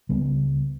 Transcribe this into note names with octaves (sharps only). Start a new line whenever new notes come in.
C#2 C#3 G3 B3